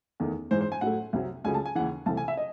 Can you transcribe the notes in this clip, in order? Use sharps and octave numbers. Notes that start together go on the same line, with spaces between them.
E2 D#3 A3
G#2 E3 G#3 C5
C5
G#5
A2 F#3 A3 F#5
C2 C3 F#3
C#2 C#3 F#3 A3 G#5
A5
G#5
D#2 C#3 E3 F#5
C2 C3 E3 A3 A5
G#5
E5
D#5